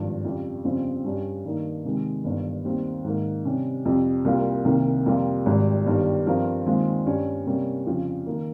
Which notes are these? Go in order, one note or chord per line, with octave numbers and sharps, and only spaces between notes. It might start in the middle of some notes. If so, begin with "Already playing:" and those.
Already playing: G#1 G2 F3
F2 C#3 G3
G1 F2 C#3 G3 C4
G2 G3 C#4
G2 D#3 A#3 D#4
C3 D#3 G#3
G1 G2 D#3
D#2 D#3 G3 C4 G4
G#2 D#3 A#3
C3 G3 C#4
F2 C3 G3
C2 C3 G3 A#3 F4
C2 C3 D#3 A#3
F2 C3 G3 A#3 F4
G#1 G#2 G3
G1 G2 D#3 G3
G2 F3 C4 F4 A#4
D#2 D#3 G#3 C4 F4
G2 G3 C#4
C3 G3 A#3 C#4
F2 C#3 F3
D#3 A#3